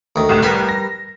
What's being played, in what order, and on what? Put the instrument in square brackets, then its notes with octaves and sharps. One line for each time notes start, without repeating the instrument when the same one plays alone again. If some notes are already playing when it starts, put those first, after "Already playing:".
[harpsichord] D2 D#3
[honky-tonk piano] C2 A2 E7
[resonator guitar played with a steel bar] G3 A#4 [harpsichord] B4 B5 C6
[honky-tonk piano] A#6